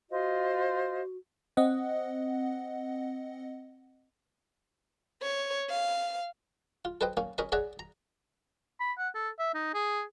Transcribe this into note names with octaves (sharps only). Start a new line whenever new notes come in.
F4 F#4 C5 D#5
C4 D#5 F#5
C#5
F5
F4
A4 B4 C5 D#5 G5
A#3 C#4
C#4 A#4 D#5 B5
G#4 C#5 D5 E5 F#5 A#5
A#5
B5
F#5
A4
E5
D#4
G#4